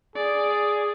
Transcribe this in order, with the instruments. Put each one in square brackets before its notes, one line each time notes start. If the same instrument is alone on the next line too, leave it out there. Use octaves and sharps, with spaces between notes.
[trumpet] G#4 [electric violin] D5